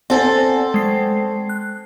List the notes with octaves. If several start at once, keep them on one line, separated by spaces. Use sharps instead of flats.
C4 A4 D5 F#5 G#5
G#3 C7
F#6